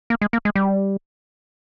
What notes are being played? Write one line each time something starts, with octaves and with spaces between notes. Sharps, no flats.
A#3
G#3
A#3
G#3
G3